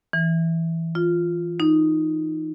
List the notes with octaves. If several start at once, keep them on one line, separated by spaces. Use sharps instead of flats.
E3
F4
D#4